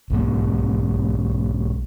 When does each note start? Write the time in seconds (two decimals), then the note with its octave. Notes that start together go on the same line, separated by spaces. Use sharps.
0.10 B1 G#2 A#3